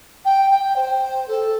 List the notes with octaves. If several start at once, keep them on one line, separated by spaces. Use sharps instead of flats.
G5
G5
C5
A4